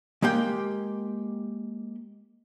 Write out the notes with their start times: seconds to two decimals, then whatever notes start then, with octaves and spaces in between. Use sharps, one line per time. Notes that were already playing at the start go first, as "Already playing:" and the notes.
0.22 G#3 A#3 G4 G5